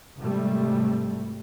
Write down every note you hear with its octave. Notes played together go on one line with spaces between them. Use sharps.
G#1 C3 G3 A3